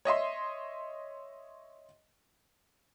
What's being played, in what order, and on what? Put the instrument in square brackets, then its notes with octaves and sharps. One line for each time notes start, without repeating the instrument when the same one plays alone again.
[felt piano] C#5 D#5 E5 C6